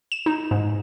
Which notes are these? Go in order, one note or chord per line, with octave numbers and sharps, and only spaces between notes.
E7
D#4
G#2